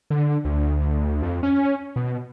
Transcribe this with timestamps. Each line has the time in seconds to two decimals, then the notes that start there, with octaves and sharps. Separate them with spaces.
0.10 D3
0.45 D2
1.22 F2
1.43 C#4
1.96 B2